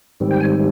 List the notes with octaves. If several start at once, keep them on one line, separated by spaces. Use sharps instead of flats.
G#2 D#3 G3 C4
G5
G#5